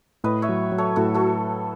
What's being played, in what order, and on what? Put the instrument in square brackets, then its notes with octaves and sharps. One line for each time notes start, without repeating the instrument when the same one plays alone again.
[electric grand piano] A2 [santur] B4 D#5
[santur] C#5 E5
[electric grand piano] F#3
F#3
[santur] A4 C#5
[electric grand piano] A2 [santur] F#4 A4
[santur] F#4 A4